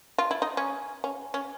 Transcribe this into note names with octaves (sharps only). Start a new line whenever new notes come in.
F4
E4
D#4
C#4
C#4
C#4